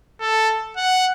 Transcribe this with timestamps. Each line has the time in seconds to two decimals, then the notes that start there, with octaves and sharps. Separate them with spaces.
0.20 A4
0.77 F#5